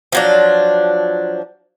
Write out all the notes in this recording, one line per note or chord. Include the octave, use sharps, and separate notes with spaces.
F3 F#3 D4